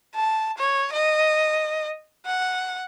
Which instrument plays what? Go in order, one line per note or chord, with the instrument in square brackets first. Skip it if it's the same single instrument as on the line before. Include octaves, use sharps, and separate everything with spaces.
[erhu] A5
C#5
D#5
F#5